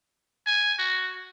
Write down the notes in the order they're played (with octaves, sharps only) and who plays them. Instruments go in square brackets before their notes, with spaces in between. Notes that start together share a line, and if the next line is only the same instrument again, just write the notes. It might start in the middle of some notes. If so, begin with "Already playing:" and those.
[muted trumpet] G#5
F#4